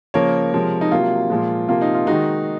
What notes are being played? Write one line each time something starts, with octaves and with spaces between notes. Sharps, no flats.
C#3 F3 A#3 A#4 C#5
C3 F3 G#3
D#4
C3 F#3 A#3 F4
A#2 F3 G#3
C3 F3 A#3 F4
D#4
F4
D#3 G#3 D#4 F#4